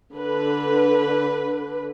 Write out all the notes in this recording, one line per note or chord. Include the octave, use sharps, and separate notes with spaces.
D3 B4